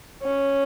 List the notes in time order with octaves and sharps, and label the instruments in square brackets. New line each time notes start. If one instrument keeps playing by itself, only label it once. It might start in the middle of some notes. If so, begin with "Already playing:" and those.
[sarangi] C#4